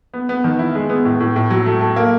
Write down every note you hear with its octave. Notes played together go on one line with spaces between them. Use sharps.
B3
B3
D#3
E4
G#3
B3
A2
A2
A2
F#3
A3
A3
A#3